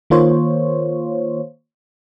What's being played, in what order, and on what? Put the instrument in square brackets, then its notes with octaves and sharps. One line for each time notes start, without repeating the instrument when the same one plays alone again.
[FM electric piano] D#3 A#3 F4 C5 C#5